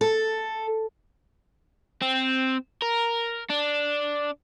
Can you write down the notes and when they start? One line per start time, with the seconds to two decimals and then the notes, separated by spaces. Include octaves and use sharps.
0.01 A4
2.02 C4
2.82 A#4
3.49 D4